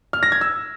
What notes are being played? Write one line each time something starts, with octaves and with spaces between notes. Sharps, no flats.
F6
A#6
G#6
E6